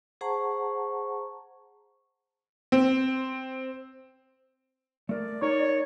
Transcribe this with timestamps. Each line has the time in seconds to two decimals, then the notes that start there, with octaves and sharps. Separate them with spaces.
0.21 G#4 C5 F#5 A5 A#5 C#6
2.72 C4
5.09 A3 A#4 D5
5.42 D#4 A#4 C#5 A#5